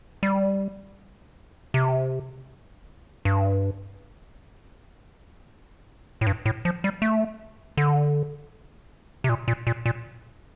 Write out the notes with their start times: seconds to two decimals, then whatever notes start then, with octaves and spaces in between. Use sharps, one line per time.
0.23 G3
1.74 C3
3.25 G2
6.21 A2
6.27 G2
6.46 A2
6.65 F3
6.84 G3
7.02 A3
7.77 D3
9.24 C3
9.29 A#2
9.48 A#2
9.67 A#2
9.86 A#2